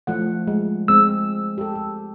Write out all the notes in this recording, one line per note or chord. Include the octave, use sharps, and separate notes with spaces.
F3 A3 F#5
G#3
G#3 C4 E6
G4 A4